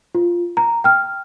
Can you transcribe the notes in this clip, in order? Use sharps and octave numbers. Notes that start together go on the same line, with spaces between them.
F4
A#5
G5 F6